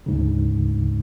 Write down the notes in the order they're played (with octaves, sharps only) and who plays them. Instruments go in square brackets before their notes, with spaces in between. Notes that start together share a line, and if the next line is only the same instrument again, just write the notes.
[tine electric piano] D2 G#2 C#3